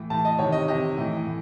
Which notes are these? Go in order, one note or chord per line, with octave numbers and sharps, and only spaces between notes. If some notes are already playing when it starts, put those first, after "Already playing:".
Already playing: A2 E3
A2 E3 A5
D#5
C3 D#3 C#5
D#5
C3 D#3 D#5
A2 E3
A2